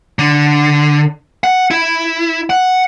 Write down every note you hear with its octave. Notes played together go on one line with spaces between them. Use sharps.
D3
F#5
E4
F#5